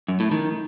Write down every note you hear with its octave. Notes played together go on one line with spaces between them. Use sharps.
F#2
A2
D#3